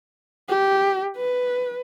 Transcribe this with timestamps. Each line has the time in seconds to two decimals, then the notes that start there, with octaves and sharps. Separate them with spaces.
0.49 G4
1.17 B4